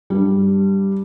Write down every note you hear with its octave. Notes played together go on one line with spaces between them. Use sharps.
G2 G3